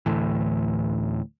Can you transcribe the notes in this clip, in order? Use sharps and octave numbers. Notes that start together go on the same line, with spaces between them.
D1 D2 A2 E3